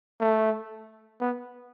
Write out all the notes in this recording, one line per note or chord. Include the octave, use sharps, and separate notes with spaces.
A3
B3